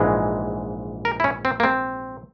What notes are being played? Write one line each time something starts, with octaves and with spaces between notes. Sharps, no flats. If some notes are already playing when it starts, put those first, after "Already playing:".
Already playing: A#1 G#2 E3 G#3
A#4
E4
C#4
C4
A#3
C4